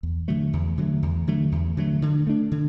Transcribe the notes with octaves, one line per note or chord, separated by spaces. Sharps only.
E2
D3 F#3 A3
E2
D3 F#3 A3
E2
D3 F#3 A3
E2
D3 F#3 A3
D3
A3 D4
D3